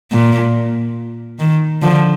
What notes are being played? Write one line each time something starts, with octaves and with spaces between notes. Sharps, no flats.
A#2
D#3
D3 F3